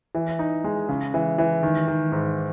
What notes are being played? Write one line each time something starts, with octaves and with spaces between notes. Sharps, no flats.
E3
D#4
G#3
C#3
E3
E3
D#3
D#3
G#2